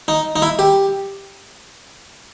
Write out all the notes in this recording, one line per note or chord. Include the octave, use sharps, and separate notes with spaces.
D#4
D#4
E4
G4